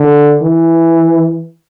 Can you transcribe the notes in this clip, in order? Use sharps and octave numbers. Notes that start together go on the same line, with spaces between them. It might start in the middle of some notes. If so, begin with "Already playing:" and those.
Already playing: D3
E3